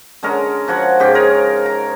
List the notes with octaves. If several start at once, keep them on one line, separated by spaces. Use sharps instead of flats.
D3 G#3 C#4 A#4
F3 F#4 C#5 F#5
G#2 C#3 G4
F4 G#4 A#4 C#5
A#5